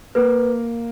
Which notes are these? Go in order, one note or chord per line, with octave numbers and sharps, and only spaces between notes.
A#3 B4